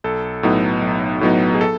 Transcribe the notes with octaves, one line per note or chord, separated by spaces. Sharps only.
B1 A4
A2 F#3 B3 D#4
B1
A2 F#3 B3 D#4
G#4
A4